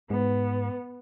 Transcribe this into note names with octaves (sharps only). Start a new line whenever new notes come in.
G#2 B3